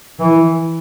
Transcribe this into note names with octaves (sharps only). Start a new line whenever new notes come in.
E3